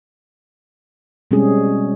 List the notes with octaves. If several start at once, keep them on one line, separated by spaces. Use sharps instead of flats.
B2 G3 G#3 C4 C#4 G#4